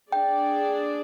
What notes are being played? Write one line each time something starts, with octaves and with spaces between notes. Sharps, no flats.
D4 G#4 D5 G5